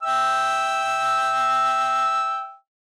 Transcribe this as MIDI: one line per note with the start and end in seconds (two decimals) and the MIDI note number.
0.03 2.55 76
0.03 2.55 79
0.03 2.55 88